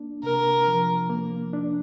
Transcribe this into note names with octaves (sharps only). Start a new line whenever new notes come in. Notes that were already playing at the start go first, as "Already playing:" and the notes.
Already playing: A#3 D4
C3 A#4
F3
A#3
D4